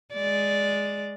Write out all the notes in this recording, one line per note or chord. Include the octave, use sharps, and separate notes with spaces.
G#3 D5